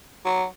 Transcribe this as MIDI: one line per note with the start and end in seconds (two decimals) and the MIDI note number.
0.25 0.44 54